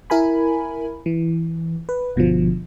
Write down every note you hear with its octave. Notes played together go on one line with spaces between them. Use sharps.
E4 A#4 G#5 B5
E3
B4
G1 B2 D3 F3